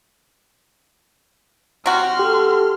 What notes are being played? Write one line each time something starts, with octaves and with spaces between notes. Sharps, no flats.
C3 F#4 C6 F6
G4 A4